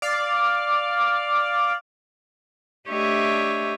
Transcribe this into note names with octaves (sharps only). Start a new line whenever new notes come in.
D5 F5
A3 D4 G4 C#5 D#5 E5